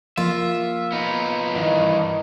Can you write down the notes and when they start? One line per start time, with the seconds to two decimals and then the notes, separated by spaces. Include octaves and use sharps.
0.17 F3 A#3 F4 E5
0.92 B3 D#4
1.55 G2 D#3 E3